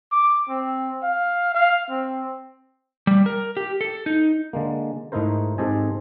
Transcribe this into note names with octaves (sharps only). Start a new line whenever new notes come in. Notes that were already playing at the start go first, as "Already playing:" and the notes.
D6
C4
F5
F5
C4
G3
A#4
G4
A4
D#4
D3 G#3 A#3
G#2 A3 D#4 E4 A#4 C5
G#2 C4 G4 A4 D#5 G#5